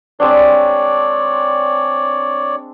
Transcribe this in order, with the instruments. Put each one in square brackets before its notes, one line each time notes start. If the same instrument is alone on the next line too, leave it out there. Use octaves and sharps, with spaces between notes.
[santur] G#3 C4 D4 [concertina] C#5 D5